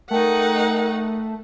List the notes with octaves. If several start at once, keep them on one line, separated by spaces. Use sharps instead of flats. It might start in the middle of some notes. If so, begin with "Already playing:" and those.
A3 D#4 A#4 F#5 G5